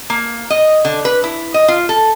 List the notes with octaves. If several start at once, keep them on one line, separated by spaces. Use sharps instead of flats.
A#3
D#5
D3
B4
E4
D#5
F4
A4